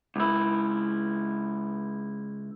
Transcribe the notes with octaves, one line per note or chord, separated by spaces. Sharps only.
C#2 E4